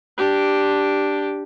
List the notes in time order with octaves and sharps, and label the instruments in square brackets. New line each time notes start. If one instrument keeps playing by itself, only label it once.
[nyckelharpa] D4 G4